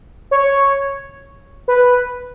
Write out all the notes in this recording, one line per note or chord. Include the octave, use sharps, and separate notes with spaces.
C#5
B4